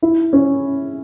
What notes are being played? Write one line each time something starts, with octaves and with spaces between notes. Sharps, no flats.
E4
C#4